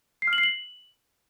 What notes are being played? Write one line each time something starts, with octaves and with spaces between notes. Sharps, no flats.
C7
F6
F#7
C7
F#7